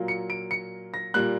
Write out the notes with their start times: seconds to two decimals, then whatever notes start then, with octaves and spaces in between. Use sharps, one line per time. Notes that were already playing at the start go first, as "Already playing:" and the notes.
Already playing: A#2 F#3 A#3
0.08 C#7
0.30 D7
0.51 C#7
0.94 A#6
1.14 A#2 G3 A#3 F#6